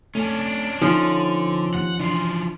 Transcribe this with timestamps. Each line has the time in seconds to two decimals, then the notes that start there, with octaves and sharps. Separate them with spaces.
0.15 A3 C#4 D4
0.82 D3 F3 C#4 D#4
1.74 D#2 F#5
2.00 E3 D4 F4